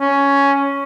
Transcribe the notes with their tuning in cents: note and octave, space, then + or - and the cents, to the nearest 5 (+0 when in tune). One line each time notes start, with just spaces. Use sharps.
C#4 +5